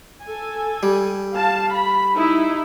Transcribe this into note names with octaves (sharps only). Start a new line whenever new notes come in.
A4 G#5
G3
F5 A5
B5
D#4 E4